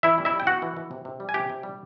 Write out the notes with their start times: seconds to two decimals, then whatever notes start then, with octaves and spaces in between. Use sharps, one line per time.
0.03 E3 E4 E5
0.18 G3
0.25 E4 E5
0.33 G3
0.40 G5
0.47 B3 F#4 F#5
0.62 E3
0.77 E3
0.91 C3
1.05 C3
1.20 G3
1.29 G#5
1.34 C3 G4 G5
1.50 C3
1.63 G3